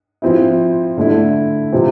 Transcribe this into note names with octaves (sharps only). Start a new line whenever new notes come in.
F3 C4 E4
D3 A3 E4
C3 F3 C4